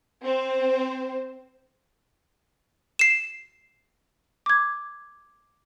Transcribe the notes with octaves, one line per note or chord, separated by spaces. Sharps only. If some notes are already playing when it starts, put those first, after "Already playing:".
C4 C5
C7 E7
D6 G#6